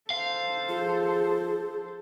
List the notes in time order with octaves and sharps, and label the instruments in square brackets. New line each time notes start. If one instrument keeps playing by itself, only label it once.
[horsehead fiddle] A4 C5 [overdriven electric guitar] F5
[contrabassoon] F3 [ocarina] G#4